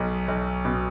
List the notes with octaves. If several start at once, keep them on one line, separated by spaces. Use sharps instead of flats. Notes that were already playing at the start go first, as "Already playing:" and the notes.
Already playing: B1 B2
B1
B2